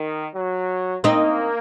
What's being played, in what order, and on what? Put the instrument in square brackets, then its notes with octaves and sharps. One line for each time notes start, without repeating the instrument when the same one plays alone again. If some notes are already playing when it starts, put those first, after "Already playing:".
Already playing: [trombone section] D#3
F#3
[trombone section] A#3 [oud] C4 D#4